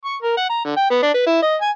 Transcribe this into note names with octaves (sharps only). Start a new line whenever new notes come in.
C#6
A#4
F#5
A#5
D3
G5
B3
D4
B4
E4
D#5
G#5